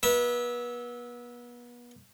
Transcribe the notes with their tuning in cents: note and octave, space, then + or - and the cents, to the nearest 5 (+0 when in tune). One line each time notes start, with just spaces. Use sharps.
B3 -35 E5 -20